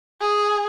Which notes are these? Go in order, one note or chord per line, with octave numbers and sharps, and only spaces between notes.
G#4